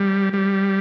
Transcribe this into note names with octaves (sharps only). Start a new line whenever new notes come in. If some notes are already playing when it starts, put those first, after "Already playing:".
Already playing: G3
G3